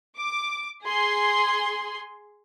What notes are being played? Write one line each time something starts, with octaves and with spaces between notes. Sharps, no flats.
D6
G#4 C6